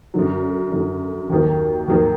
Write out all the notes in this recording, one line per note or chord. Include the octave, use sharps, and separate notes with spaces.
F#2 D3 F#3
F#2 D3 F#3
D#2 D#3 F#3
D#2 D#3 F#3